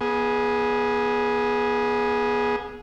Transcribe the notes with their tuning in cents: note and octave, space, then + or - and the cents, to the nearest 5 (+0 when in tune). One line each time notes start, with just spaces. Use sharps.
B3 -25 G#4 +5